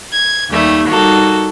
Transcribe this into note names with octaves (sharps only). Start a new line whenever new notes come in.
G#6
D#2 D#3 G3 A3 G#6
G3 A#3 D#4 F#4 A4